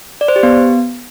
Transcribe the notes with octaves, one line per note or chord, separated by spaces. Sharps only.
D5
C5
G4
B3